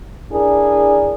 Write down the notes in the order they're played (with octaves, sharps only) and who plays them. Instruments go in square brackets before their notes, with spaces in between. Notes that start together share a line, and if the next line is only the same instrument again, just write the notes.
[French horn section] D4 E4 G#4 A#4 D5